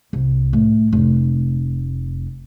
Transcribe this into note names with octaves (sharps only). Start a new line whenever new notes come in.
C2
A2
F1